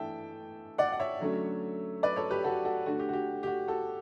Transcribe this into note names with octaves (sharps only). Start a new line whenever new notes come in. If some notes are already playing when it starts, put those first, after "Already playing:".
Already playing: E3 A3 D4 E5 G5 A5
D5 F#5
F#5
C#5 E5
D3 F#3 A3 C#4
B4 D5
A4 C#5
G4 B4
F#4 A4
F#4 A4
D3 A3 D4 F#4
G4
F#4
G4
G4
F#4
F#4 A4